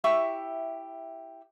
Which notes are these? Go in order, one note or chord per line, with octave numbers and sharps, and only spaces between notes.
E4 G4 E5 C#6